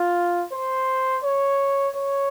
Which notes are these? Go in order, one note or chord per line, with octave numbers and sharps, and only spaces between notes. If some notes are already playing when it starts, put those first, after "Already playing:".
Already playing: F4
C5
C#5
C#5